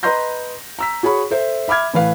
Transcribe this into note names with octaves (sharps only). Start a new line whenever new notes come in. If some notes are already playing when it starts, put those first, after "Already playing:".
B4 D#5 A#5 C6 G6 A#6
A#5 E6 B6
F#4 G#4 C#5 B5 C#6
A4 C5 E5
E5 B5 D6 F6 G#6
A2 E3 B4 F5